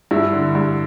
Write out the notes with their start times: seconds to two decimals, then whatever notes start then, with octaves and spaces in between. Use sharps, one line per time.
0.11 G2 E4
0.33 D3
0.55 G2